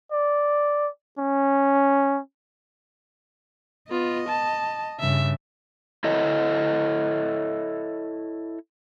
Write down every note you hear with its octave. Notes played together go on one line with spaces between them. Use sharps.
D5
C#4
B3 F4 D#5
A5
G2 C#3 E5
E4 A4 C#5 D#5